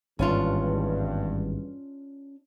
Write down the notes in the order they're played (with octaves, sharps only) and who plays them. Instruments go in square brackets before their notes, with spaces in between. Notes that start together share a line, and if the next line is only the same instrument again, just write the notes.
[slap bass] G#1 [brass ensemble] E2 G2 [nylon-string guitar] C#4 D4 F4